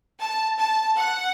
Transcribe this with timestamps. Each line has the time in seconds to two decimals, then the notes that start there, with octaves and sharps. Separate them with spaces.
0.20 A5
0.58 A5
0.97 F#5